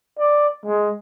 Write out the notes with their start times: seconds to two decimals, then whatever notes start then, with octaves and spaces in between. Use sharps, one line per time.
0.18 D5
0.66 G#3